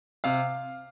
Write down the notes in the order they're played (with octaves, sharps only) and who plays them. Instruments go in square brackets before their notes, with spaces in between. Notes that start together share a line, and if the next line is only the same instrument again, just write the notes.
[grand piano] C3 F5